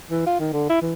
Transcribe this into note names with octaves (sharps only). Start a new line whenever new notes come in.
E3
F4
D#3
D3
E4
E3